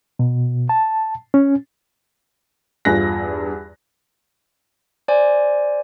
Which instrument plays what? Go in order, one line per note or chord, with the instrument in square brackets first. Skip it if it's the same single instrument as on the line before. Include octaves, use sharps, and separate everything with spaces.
[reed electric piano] B2
A5
C#4
[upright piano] E2 G2 F4 G#5 F#6 A#6
[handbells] C5 D5 G#5